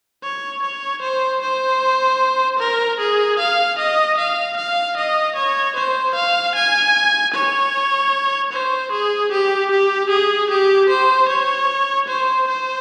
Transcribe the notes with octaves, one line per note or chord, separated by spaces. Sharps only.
C#5
C#5
C5
C5
A#4
G#4
F5
D#5
F5
F5
D#5
C#5
C5
F5
G#5
C#5
C5
G#4
G4
G4
G#4
G4
C5
C#5
C5
C5